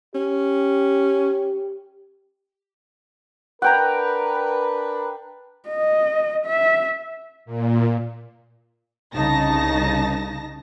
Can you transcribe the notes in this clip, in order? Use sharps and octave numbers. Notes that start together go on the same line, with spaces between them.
C#4 G4
D4 A#4 B4 F#5 G5 A#5
D#5
E5
A#2
C2 C#3 D#4 A5 A#6